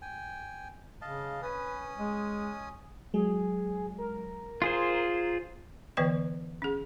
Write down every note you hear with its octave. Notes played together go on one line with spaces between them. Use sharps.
G5 G#5
C#3 D#5 F5 A5
C#4 B4 G#5 D#6
G#3
F#3 G#3 G#4
A#4
F4 G#4 C5 A#5 G#6
D3 E3 B3 B4 D#5 G5
C#4 G#4